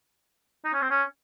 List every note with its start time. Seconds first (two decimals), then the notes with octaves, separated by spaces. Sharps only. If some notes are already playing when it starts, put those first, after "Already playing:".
0.65 D#4
0.74 C#4
0.82 C4
0.90 C#4